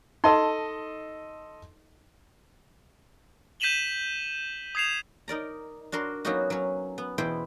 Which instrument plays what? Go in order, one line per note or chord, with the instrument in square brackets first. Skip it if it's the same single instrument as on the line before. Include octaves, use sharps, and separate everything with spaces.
[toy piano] D#4 [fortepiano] A4 D#5 C6
[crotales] G6 B6 D#7 E7 F#7 G7
D#6 G#6 C7 E7 F7
[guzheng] D#4 A#4 D5 A#5
D4 F#4 A#4 C6
F#3 A#3 B3 C#4 D#4 F#4
F#3 C#4
B3
E2 B2 E4 C5 G5